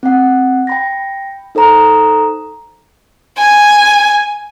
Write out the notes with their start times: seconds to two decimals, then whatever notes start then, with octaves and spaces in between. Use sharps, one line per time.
0.03 C4 F#5
0.67 G5 B5 A#6
1.55 D#4 A4 C5 A#5
3.38 G#5